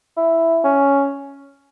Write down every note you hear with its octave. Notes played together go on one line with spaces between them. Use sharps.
E4
C#4